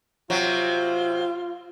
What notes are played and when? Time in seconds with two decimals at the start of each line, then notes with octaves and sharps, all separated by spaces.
0.30 C3 F#3 F4